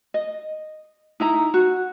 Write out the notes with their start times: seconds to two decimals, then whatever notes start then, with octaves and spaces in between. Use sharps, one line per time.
0.14 D#5
1.20 D#4 E4 A#5
1.54 F#4